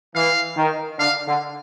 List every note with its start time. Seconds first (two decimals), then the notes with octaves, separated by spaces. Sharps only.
0.15 E3 F5
0.57 D#3
0.99 D3 F5
1.27 D3